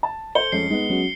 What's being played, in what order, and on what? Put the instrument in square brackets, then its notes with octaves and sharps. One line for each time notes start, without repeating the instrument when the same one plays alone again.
[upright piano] A5
[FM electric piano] A4 [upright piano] C5 [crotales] C#7 G7
[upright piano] F2 G#3 C#4 [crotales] C7
[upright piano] G#3 B3 [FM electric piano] D#4
[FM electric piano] F#3 C#4 F#4